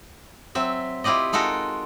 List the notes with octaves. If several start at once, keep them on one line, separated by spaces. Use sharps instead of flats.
F#3 C4 E5
E4 F4 G4 D5 D#5
G#3 D#4 F4 F#4 A4 A#4